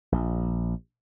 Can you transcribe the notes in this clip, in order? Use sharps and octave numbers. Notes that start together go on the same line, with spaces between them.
A#1